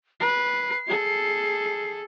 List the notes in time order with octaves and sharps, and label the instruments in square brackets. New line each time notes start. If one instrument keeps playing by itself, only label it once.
[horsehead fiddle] B4 [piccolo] C7
[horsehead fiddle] G#4 A4